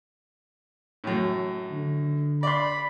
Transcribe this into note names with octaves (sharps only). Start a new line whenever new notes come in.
F#2 A2
D3
D5 B5 C6